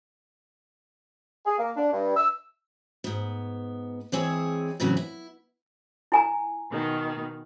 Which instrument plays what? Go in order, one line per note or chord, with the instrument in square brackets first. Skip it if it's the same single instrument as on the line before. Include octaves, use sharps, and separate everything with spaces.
[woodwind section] G#4
A#3
D4
G2
E6
[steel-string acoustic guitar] G#2 B3
E3 G#3 C4 E4 G#4 C#5
A2 C#3 E3 F#3 C4
E4
[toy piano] E4 G#5 A#5
[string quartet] B2 D#3